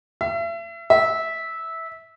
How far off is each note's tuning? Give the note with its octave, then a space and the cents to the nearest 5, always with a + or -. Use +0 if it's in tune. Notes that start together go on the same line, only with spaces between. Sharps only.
E5 +35
E5 -15